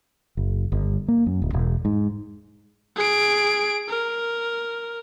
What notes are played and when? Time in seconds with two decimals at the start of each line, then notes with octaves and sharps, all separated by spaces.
0.37 F#1
0.72 G1
1.08 A#3
1.26 F#2
1.42 D1
1.53 E1
1.85 G#2
2.96 G#4 D7
3.88 A#4